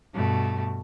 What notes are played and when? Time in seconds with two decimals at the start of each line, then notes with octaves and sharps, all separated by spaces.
0.14 G2 B2 A3